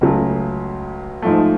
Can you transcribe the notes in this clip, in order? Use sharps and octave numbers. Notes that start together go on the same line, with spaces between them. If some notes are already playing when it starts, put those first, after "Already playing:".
C#2 C#3 F#3 A3
G#2 F3 A3